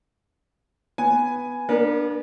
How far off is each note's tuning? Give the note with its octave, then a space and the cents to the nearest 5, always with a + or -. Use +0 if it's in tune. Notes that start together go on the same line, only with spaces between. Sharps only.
B3 +0 G#5 +0
B3 -35 D4 +15 A#4 +0